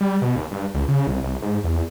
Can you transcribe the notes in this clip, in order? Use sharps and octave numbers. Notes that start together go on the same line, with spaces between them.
G3
B2
D#2
G2
C#2
C#3
C2
C2
G#2
E2